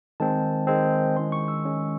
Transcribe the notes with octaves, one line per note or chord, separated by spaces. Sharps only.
D#3 G#3 C4 A5
D#3 G#3 C4
D#3 G#3 C#4 E4 C6
C#6
E6
D#3 G#3 C#4 E4